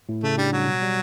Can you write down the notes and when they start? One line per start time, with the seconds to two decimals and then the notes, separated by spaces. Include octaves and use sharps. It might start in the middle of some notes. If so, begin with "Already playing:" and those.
0.09 A2
0.23 C#3 A3
0.38 G3 D4
0.52 F#3 G3
0.68 B2
0.82 G3